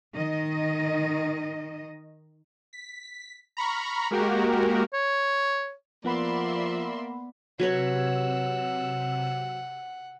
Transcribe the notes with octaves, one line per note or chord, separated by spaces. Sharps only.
D#3 D#5
B6
A#5 B5 C#6 F6
G#3 A#3 F#4 G4 A#4
C#5
F3 A#3 B3 D5 E5 F#5 B5 C6
C3 F#3 B4 C#5 F#5 E6